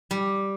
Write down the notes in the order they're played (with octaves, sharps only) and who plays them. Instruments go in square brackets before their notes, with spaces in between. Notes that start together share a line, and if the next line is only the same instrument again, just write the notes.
[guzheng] G3